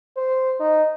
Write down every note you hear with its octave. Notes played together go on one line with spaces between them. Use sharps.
C5
D#4